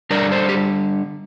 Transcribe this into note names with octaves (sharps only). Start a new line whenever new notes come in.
D3 G3 D4 A#4 D5
A4 C5
G4